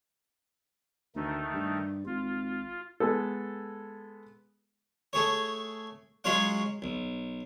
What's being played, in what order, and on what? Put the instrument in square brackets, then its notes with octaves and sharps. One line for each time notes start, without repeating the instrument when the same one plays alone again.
[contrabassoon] D2 [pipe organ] D#3 A3 D#4
[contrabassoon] G2
[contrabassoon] G#1 [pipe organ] F4
[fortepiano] G#3 B3 A4
[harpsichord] A3 G#4 C#5
F#3 G#3 C#4 F4 C#5 F#5
B1